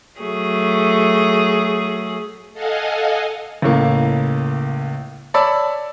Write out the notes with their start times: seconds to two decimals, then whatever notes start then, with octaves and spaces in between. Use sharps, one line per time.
0.20 F#3 A3 G#4
2.53 A4 D#5 F5 F#5 G#5
3.62 C#2 A2 A#3
5.34 C#5 D5 A5 B5 E6